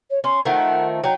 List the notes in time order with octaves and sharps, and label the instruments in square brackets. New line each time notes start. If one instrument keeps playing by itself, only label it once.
[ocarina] C#5
[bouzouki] C#4 [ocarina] C6
[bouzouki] D#3 F3 A3 [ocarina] F#5
[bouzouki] F#3 D#4 [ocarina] G5